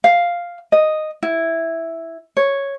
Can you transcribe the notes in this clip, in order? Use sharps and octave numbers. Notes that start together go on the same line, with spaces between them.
F5
D#5
E4
C#5